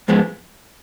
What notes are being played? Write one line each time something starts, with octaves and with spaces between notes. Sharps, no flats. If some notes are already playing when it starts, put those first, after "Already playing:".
G#2 F3 G#3 B3